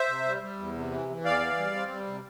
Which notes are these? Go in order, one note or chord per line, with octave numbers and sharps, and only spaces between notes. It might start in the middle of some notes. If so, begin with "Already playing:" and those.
Already playing: C5 E5
C3
G3
G3
E2
C3
E3
E3
E2 D5 F5
E3
G3
C4
G3
C3